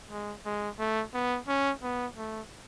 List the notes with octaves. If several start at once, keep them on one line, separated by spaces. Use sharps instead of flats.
G#3
G#3
A3
B3
C#4
B3
A3